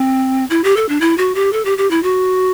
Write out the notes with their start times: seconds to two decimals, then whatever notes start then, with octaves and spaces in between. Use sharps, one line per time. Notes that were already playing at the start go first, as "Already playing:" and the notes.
Already playing: C4
0.50 E4
0.64 G4
0.77 A4
0.89 D4
1.01 E4
1.18 F#4
1.35 G4
1.53 A4
1.65 G4
1.78 G4
1.91 E4
2.03 F#4